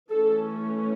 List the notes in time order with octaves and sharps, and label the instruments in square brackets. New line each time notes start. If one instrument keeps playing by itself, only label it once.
[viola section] E3 A3 C#4 A4